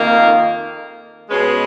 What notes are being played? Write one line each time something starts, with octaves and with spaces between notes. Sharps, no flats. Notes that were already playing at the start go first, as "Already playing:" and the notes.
Already playing: F2 D#3 A#3
B2 G#3 C#4 G#4 B4